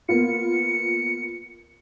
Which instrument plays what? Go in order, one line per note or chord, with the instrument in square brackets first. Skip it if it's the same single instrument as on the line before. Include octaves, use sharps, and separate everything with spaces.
[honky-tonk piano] A#3 B3 F4 [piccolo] C#7